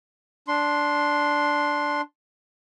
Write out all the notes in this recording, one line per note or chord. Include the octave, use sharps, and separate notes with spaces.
D4 C6